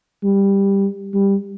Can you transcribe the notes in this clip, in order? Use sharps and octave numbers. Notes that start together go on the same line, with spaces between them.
G3
G3